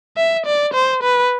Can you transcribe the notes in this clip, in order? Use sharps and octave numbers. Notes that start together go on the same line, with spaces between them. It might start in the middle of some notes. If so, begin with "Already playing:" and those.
E5
D5
C5
B4